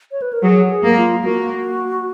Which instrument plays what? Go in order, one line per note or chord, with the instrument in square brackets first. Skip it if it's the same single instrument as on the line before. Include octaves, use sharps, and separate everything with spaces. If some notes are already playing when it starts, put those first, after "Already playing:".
[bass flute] C#5
B4
A#4
[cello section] F#3 [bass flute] G#4
[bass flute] G#4
[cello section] A#3
[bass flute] F4
[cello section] A#3 [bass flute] F#4